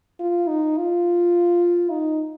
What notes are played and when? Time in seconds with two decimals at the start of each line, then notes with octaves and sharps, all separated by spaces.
0.20 F4
0.48 D#4
0.77 F4
1.91 D#4